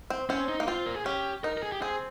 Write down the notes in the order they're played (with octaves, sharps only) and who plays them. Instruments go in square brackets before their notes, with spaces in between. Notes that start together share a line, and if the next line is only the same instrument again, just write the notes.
[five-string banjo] C4
[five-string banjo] C4 [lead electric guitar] C#4
[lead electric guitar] D#4
[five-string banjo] A#3
[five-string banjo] C4 [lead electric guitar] F4
[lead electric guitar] A#4
G#4
[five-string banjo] C#4 [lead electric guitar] G4
[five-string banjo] D#4 [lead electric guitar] A#4
[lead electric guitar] A#4
G#4
G4
[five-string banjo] C4 [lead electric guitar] G#4